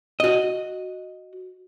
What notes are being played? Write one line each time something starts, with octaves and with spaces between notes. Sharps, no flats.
F#4 D#5